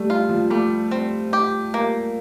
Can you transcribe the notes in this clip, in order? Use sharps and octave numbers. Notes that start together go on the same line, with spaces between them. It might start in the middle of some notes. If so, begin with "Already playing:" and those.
Already playing: G3 A3
F4
F3
G3 A3
C4
G4
A#3